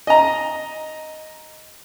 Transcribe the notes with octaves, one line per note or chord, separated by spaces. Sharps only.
D#5 A#5